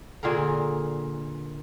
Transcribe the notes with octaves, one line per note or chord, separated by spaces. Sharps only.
A#2 D3 G#4 A#4